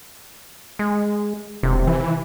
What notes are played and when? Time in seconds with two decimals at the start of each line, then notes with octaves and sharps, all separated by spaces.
0.79 G#3
1.63 E1 C3
1.87 E3